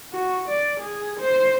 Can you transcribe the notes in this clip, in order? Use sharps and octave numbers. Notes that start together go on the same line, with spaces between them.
F#4
D5
G#4
C5